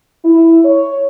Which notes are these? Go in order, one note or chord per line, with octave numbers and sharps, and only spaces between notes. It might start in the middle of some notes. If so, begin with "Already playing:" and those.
E4
C#5